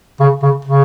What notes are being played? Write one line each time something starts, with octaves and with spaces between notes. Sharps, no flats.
C#3
C#3
C#3